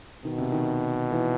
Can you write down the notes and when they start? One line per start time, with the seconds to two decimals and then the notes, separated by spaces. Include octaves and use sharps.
0.24 B2 D#3
0.38 C3
0.52 D#3
1.12 E3